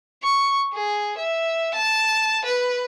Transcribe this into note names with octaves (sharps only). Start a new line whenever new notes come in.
C#6
G#4
E5
A5
B4